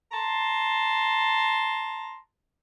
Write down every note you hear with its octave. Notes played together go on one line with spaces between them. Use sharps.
A5 A#5 C6